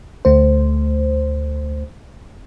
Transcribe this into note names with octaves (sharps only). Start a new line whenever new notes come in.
D2 A3 C5